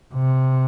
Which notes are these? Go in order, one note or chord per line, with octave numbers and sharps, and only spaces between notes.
C3